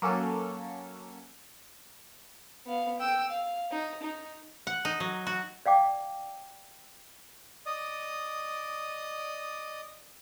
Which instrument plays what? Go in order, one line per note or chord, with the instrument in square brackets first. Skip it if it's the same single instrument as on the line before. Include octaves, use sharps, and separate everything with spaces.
[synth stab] F#3 A#3 C#4 A4
[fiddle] B3 F5
G5 E6
F5
D#4
D#4
[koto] F#5
D#4
F#3
F#4
[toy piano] D5 F5 G5 D6
[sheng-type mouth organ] D5 D#5 D#6